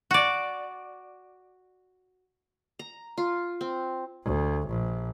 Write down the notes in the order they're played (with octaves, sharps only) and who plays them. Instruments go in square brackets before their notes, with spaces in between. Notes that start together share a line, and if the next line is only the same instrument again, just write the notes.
[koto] F#4 D5
[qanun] A#5
F4
C4
[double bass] D2
A#1